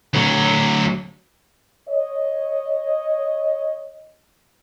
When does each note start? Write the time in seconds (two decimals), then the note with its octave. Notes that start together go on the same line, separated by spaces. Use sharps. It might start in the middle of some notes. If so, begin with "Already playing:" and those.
0.14 D2 F#3
1.89 C#5 D#5